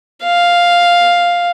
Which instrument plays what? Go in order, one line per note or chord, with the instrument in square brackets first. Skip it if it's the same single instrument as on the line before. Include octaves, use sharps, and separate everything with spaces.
[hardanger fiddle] F5